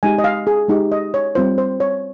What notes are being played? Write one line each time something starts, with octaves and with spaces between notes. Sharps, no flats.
G#3 D#4 G4 G#5
D#5
F5
G#4
G#3 D#4 G4
D#5
C#5
G3 C4 F4 C5
C5
C#5